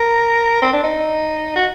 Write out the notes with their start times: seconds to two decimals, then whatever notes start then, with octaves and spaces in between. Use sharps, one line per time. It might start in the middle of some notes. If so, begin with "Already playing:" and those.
Already playing: A#4
0.62 C4
0.73 D4
0.83 D#4
1.56 F#4